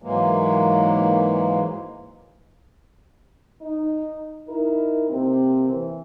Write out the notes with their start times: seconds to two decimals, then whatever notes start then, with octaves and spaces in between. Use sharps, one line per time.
0.02 G#2 E3 F#3 G#3 A#3
3.61 D#4
4.48 D#4 E4 A#4
5.09 C3 A#3 C4
5.69 E3